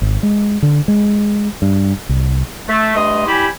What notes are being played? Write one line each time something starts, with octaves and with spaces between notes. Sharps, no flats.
G#1
G#3
D3
G#3
G2
C2
A3
G2 A3 D#5 C6 D#6
G3 E4 G4 G#5 B5